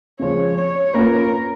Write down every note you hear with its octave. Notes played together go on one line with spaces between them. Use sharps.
C#3 F3 G#3 C#5
C#5
A#3 C#4 F4 A#4 B4